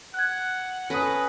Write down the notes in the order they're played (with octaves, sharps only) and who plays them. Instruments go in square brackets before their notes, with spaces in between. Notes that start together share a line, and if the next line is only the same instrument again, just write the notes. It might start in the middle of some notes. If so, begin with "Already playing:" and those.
[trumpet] F#5 [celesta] F#6 G#6
[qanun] C#4 F#5 A#5 [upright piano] A4 D#6 [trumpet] B4